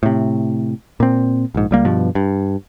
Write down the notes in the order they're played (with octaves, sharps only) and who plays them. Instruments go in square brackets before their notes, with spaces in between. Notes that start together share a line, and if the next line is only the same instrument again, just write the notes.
[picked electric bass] A2 C3
A#2 C4
A#1 G#2
C#2 G3 A#3
G2 B2 F3
G2